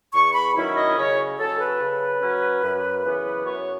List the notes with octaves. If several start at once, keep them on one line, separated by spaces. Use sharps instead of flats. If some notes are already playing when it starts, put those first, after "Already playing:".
E2 C#6
B5
D#3 F#3 C#4 E4
D#5
C#3 C#5
F#3 C#4 A4
B4
C#3
F#3 C#4
F#2
C#3 E3 B3
F#2 C#5